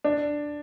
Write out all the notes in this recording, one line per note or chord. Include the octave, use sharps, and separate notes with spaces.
D4